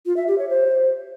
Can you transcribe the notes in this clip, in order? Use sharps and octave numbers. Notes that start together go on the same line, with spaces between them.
F4
E5
G4
C#5
C5